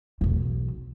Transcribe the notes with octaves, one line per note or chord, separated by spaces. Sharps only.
B1 E2